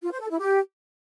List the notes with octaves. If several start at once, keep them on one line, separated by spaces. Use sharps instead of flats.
F4
C5
A4
E4
G4